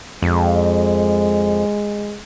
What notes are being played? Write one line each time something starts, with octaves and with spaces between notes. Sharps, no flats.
F2 G#3